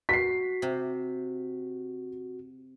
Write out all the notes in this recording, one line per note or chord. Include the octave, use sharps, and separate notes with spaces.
F#4 B6 C7
C3